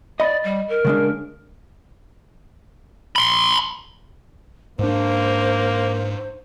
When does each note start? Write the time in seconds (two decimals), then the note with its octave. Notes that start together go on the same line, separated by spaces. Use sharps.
0.20 D5 D#5 B5
0.44 G3
0.69 A#4
0.85 C#3 G#3 D4
3.16 B5 C6
4.79 G#2 A#3 D4 C5